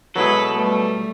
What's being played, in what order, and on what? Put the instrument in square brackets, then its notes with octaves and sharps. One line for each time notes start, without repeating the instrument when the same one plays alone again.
[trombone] B2 [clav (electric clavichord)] F#3 E4 G#4 [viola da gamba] G#3 B4 [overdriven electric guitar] A4
[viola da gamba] G3 A3